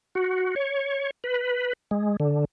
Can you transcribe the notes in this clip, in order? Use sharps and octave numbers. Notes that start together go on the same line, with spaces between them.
F#4
C#5
B4
G#3
D3